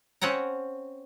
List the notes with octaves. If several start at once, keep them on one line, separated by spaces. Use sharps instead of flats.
C4 C#4 F#5 G5 A#5